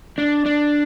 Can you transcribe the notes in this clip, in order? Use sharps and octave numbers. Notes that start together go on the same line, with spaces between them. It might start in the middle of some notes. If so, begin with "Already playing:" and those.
D4
D4